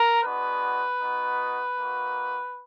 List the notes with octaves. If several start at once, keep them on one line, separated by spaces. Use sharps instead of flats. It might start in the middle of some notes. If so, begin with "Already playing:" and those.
Already playing: A#4
G#3 B3 D4 F#4 B4
B3 D#4 F#4
A#3 D#4 F#4